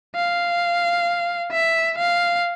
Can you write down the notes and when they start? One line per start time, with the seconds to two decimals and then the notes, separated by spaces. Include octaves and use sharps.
0.15 F5
1.52 E5
1.98 F5